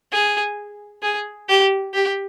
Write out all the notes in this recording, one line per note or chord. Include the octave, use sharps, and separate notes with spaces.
G#4
G#4
G4
G4